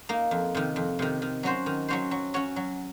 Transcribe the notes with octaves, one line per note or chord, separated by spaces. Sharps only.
A#3 D#4
F2
C3 D#3
F2
C3 D#3
D#3
F#3 C#4 F#4 C5
D#3
F#3 C#4 F#4 C5
F#3
C#4 F#4 C#5
F#3